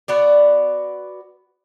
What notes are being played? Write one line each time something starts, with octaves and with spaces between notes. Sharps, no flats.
B3 F#4 D5